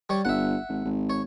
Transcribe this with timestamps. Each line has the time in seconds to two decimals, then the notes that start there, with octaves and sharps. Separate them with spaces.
0.10 G3 C#5
0.25 G1 E5 F#5
0.69 G#1
0.85 G#1
1.10 C#5